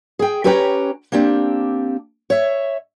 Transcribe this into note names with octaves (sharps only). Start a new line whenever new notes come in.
G#4 G5
C#4 G4 B4 C#5 G5 A#5
A#3 C4 D4 G4
C#5 E5